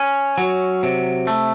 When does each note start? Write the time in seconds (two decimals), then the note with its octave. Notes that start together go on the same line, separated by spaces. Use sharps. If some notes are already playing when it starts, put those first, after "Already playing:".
Already playing: C#4
0.38 F#3
0.83 C3
1.27 A3